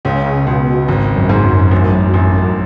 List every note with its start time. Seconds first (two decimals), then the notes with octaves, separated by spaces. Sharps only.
0.05 C#2 C#3
0.46 C#2 B2
0.88 G#1
1.16 F#2
1.29 G#2
1.44 F#2
1.71 A1
2.14 A1